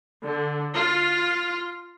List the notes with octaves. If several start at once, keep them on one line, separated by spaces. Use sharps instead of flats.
D3
F4